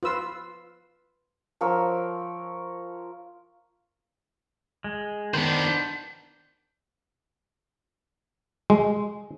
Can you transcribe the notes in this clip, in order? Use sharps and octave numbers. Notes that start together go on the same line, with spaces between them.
F4 B4 E6
F3 A#4 C#5 E6
G#3
D#3 B3 D4 C5
G#3